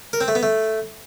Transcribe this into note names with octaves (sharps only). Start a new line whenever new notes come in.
A#4
C4
A3
B3
A3